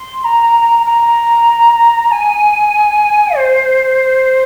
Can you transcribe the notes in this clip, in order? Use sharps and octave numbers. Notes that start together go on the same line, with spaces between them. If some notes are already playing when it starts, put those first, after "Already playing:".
Already playing: C6
A#5
A#5
G#5
C5